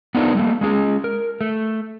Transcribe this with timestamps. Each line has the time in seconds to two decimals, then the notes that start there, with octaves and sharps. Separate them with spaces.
0.15 B3 D4 D#4 F4 A#4 B4
0.35 G3 A3 A#3
0.61 G#3 C#4 G#4
1.04 A#4
1.41 A3